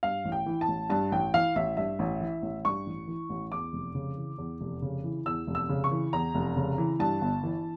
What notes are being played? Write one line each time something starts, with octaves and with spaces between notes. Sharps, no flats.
G2 F5
A1
G5
E3
A5
A1
G2 A5
A1 G5
E3 F5
A1 E5
G2 E5
A1
E3
A1
G2 C#6
A1
E3
A1
E2 D6
F1
C#3
E3
E2
F1
C#3
E3
E2 E6
F1
E6
C#3
C#6
E3
E2 A#5
F1
C#3
E3
G2 A5
G1
E3